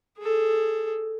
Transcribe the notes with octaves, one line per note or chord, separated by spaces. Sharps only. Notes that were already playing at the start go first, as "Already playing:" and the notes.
G#4 A4